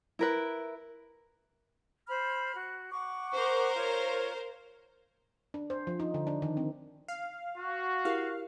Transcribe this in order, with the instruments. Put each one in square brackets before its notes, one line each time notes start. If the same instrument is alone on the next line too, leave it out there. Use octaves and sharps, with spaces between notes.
[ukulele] E4 A#4 B4
[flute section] C5 B5 F6
F#4
F#5 C#6 D6
[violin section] A#4 C5
[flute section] F4 C#5
[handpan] D4
C5
F3
D#4
D3
D4
D#3
C4
[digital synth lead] F5
[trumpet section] F#4
[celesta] E4 G4 A#4 [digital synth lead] F5